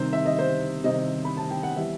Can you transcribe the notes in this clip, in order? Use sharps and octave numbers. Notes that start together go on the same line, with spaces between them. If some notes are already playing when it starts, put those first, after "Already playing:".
Already playing: C3 D#3 G3 C4 C5
E5
D#5
C5
C3 D#3 G3 C4 D#5
B5
A5
G5
F#5
E3 G3 B3 E5